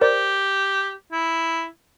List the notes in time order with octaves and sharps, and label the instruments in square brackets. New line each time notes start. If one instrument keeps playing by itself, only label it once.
[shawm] G4 [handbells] A#4 C5 D5
[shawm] E4